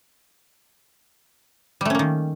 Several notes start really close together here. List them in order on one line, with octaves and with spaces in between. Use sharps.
G3 A3 C#4 A#3 D#3